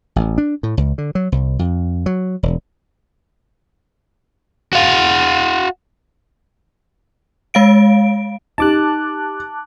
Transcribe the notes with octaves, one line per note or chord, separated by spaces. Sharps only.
A1
D4
A2
C#2
D3
F#3
C2
F2
F#3
E1
F#4 F5
G#3 F5 D7
D#4 G4 A5 D6 F#6